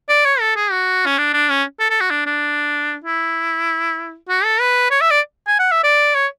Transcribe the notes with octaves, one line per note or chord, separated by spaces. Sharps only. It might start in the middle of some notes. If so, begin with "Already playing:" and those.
D5
C#5
A4
G#4
F#4
C#4
D4
D4
C#4
A4
A4
F#4
D4
D4
E4
F#4
A4
B4
C#5
E5
D5
G#5
F#5
E5
D5
C#5